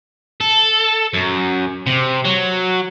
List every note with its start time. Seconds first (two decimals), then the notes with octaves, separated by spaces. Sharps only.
0.41 A4
1.14 F#2
1.87 C3
2.25 F#3